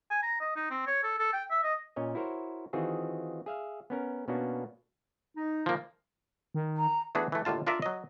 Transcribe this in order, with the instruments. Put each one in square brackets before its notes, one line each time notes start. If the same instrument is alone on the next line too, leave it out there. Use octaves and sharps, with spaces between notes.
[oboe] G#5
A#5
D#5
D#4
C4
C#5
A4
A4
G5
E5
D#5
[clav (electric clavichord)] A#2 C#4 C#5 D#5
E4 F#4 A#4 C5 C#5
D#3 E3 C4 F4 F#4 G#4
G#4 E5 F5
B3 C#4 A#4
B2 A#3 B3 C#4 D4 F#4
[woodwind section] D#4
[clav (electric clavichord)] F3 A#3
[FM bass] D#3
[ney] A#5
[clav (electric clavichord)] E3 A3 B3 D4 F#4 G#4
E3 A3
D#2 A2 D3 F4 A5
D4 F4 A4 A#4 D5 E5
F#3 D#5